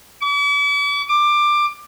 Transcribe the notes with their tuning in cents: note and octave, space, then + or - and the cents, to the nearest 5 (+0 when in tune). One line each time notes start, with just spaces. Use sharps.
D6 -45
D6 +15